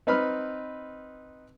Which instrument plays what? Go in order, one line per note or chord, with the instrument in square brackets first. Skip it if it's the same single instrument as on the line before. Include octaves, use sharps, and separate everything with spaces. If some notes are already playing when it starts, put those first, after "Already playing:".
[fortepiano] C4 D#4 B4 B5 F6